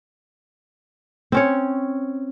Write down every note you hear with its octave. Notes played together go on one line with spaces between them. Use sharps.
C4 C#4 C#5